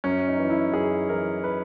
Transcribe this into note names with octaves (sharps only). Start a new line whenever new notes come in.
F#2 C#4
D#4
E3
E4
F#2 G#4
E3 A#4
B4